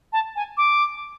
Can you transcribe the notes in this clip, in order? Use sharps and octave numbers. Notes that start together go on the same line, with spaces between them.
A5
G#5
D6